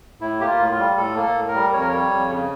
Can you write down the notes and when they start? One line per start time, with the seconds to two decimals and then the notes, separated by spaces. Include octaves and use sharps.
0.21 A2 E4
0.40 A#3 G4
0.47 F4
0.59 A2
0.72 F4
0.78 G3
0.97 A2 A4
1.16 A#3
1.23 A4
1.35 A2
1.48 A#4
1.54 G3
1.73 F2 C#5
1.81 A#4
1.88 G3 C#5
2.11 F2
2.30 C#3